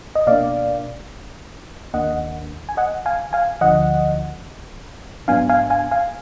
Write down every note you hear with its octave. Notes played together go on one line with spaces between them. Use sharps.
D#5
B2 A#3 D4 D5 F5
D#2 D#3 A#3 D4 D#5 F#5
G#5
D#5 F#5
F5 G#5
F5 G#5
D2 D3 F3 D#5 F#5
G#2 F#3 B3 D4 F5 G#5
F5 G#5
F5 G#5
F5 G#5